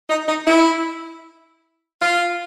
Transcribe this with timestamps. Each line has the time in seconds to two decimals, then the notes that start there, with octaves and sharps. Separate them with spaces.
0.10 D#4
0.28 D#4
0.47 E4
2.02 F4